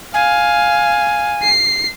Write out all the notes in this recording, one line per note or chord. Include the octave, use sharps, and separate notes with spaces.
F5 G#5
C7